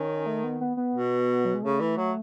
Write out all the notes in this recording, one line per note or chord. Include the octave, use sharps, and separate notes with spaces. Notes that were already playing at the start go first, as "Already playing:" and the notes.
Already playing: D#3 C#4
A3
B3
B3
B3
B2
F#3
G#3
C#3 A3
E3
F#3